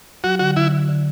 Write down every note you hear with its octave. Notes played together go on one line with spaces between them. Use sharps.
F#3 F#4
D3 F#4
D3 E4
D3
D3